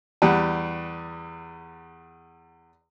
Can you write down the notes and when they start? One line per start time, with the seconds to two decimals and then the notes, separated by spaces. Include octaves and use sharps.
0.22 E2 G3 F#5